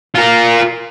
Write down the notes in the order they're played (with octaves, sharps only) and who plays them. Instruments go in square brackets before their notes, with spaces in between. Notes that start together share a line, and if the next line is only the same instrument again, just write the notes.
[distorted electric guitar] F4 A#4